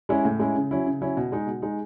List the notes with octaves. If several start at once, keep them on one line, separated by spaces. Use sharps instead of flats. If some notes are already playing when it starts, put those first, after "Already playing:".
G#3 C#4 E4
A2
G#3 C#4 E4
C#3
F#3 C#4 E4
C#3
F#3 C#4 E4
B2
G#3 D#4
B2
G#3 D#4